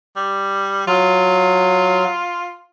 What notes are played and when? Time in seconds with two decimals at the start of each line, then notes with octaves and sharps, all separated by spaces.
0.16 G3
0.87 F#3 F4